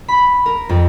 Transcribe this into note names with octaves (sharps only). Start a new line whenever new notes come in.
B5
A#4
F2